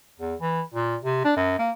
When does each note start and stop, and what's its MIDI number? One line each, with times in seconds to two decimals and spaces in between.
0.19 0.35 40
0.41 0.61 52
0.74 0.96 46
1.04 1.20 48
1.24 1.32 62
1.36 1.57 42
1.59 1.70 58